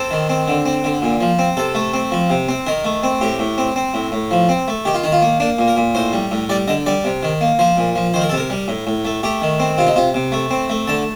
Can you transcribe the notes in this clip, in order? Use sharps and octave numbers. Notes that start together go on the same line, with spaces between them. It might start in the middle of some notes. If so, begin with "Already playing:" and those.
Already playing: C4 A4
D#3
C4
D3
C4
D3
A#2
F3
C4
C3 A4
A3
C4
F3
C3
C4
D#3 A#4
A3
C4
A2 G4
A2
C4
C4
A2
A2
F3
C4
A3
D#3 G4
F4
D#3 D#4
F4
A#3
A#3 D4
A#2
A#4
A#2
A2 C5
G3
A2
G3 D5
D3 D#5
G3 D5
C3
D#3
A#3
F3 C5
A#2
F3
D#3 C5
A#4
C3 A4
A#4
G3
A2
A2
A3
A3 G4
D#3
C4
C3 F4
D#4
C3 F4
C3
A3
C4
A3
D3 A5